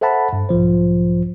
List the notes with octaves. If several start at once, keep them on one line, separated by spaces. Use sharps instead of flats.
A4 C5 E5 F#5 A5 B5
G2
B1 G#2 F3 C5